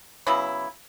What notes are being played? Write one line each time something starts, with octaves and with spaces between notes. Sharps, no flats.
C#3 F#3 B3 E4